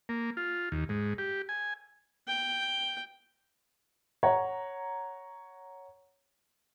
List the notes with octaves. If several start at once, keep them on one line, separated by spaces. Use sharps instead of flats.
A#3
F4
D#2
G#2
G4
G#5
G5
C#5 F#5 A#5